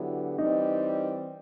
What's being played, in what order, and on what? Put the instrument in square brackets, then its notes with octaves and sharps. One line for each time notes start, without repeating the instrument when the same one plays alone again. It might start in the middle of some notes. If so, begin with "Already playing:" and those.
Already playing: [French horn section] D3 F#3 B3 E4 G4
[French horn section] E3 G3 C4 [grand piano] D#4